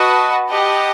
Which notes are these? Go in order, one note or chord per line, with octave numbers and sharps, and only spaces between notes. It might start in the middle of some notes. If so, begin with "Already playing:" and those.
Already playing: F#4 B4 D#5 F#5 A5 B5 D#6
G4 D#5 F#5 A5